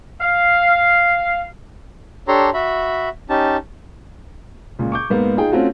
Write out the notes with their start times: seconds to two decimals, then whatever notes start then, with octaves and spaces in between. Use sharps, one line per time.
0.21 F5
2.28 D4 G4 A4 C#5 A#5 C6
2.54 F#4 E5 B5
3.30 C#4 D#4 G4 A5
4.79 C#2 A#2
4.92 C#6 D6 G6
5.10 G#2 A#3 B3
5.37 D#4 F4 G#4 G5
5.52 A3 C4 C#4 F4 F#4